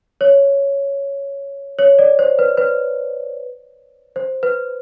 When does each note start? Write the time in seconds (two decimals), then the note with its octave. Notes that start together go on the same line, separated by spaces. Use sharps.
0.21 C#5
1.79 C#5
1.99 D5
2.19 C5
2.39 B4
2.57 B4
4.16 C5
4.43 B4